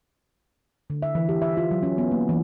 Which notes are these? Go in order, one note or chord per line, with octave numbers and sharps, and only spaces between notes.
D3
E5
E3
G4
E5
F4
F#3
C#4
B3
A#3
E3